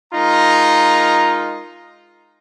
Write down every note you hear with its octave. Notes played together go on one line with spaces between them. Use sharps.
G#3 D#4 F4 A#4 A#5